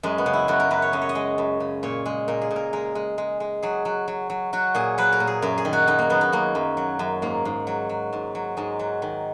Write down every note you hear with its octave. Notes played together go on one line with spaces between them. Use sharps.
F#2 G#3
B3
C#3
E4
F#2 F#4
A#4
F#2 B4
C#5
F#2 D#5
C#5
D#5
G#3
F#2
C#3
A#2 C#5
G#3
A#2 A#4
G#4
A#2
A#4
G#3 A#4
G#3
G#3
G#3
F#3 G#4
F#3
F#3
F#3
F#3 F#4
A#2 G#4
F#3 B4
A#4
A#2
G#4
F#2 A#4
G#4
D#3
F#4
F#2 D#4
A#3
F#3 B3
D#4
F#2 A#3
F#2
F#3
F#2
G#2 A#3
G#2
F#3
F#3
G#2
F#3
G#2 G#3
F#3
D#3